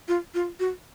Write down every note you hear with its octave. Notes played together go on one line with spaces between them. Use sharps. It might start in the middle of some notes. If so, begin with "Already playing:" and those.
F4
F4
F#4